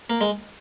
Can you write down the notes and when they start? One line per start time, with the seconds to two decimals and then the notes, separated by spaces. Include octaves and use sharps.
0.10 A#3
0.21 G#3